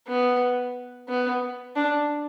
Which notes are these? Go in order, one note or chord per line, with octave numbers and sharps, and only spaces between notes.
B3
B3
D4